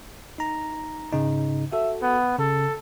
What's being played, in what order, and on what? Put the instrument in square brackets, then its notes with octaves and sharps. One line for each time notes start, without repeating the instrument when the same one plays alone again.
[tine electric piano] D#4 A#5
G#2 C#3 D#4
[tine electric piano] F#4 A4 [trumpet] E5
[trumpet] B3
[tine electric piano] C#3 [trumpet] A4